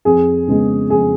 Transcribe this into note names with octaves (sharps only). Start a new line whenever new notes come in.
F2 G#4
C#3 G#3 B3
F2 G#4